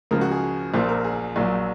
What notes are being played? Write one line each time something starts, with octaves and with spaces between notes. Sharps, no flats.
C#2 C#3 F3 A#4
F#4
G#4
A#1 A#2 F3 C5
A#4
G#4
A#1 A#2 F#3